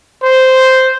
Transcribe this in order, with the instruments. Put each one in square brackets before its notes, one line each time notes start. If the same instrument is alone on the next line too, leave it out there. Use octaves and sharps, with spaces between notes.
[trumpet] C5